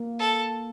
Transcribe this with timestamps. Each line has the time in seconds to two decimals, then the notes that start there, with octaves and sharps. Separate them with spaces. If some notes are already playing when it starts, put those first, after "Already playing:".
Already playing: A#3
0.19 A4